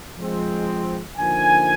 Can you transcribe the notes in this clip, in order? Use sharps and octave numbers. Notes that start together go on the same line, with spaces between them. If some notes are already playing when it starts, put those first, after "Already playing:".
F3 G#3 C4
D3 F3 A#3 D#4 G#5